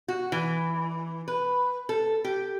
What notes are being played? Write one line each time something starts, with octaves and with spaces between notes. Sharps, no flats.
F#4
E3
B4
A4
G4